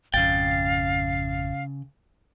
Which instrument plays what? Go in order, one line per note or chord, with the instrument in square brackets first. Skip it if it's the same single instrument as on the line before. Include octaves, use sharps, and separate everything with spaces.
[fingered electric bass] G#1 F2 [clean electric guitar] C#3 G5 [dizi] F5 [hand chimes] A6